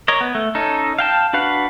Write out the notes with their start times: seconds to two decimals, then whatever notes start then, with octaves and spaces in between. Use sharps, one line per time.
0.08 A#4 C#5 D#5
0.21 B3
0.35 A3
0.55 C#4 D#4 A4
0.99 F5 G5 A5
1.33 D4 F#4 B4 F5 F#5